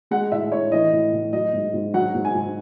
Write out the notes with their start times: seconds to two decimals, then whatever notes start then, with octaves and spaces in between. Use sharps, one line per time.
0.11 G#3 F#5
0.32 A2 E5
0.52 A2 C#5
0.72 E3 D#5
0.92 A2
1.13 A2
1.33 F#3 D#5
1.53 G#2
1.74 G#2
1.94 F#3 F#5
2.15 G#2
2.25 G#5
2.35 G#2